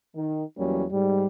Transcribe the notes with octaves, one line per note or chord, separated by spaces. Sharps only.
D#3
E2 F#3 G3 A#3 C#4
G#2 G3